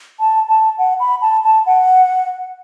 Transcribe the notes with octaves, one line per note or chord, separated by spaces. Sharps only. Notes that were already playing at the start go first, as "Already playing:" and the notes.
A5
A5
F#5
B5
A5
A5
F#5